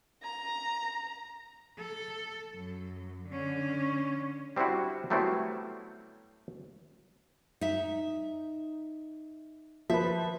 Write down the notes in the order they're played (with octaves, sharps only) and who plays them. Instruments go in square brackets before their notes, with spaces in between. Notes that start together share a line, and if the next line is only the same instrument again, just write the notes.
[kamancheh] A#5
[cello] A4
F#2
D3 C#4
[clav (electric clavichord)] G3 C4 D4 E4 F#4
F#3 G3 A3 B3 C4 E4
[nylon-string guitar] D#4 E5
[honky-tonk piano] F3 B4 [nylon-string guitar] E5